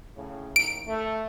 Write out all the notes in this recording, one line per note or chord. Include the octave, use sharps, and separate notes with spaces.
A2 C#3
A1 D#2 D#3 D7
A3